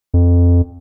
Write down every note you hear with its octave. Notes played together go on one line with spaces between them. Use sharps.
F2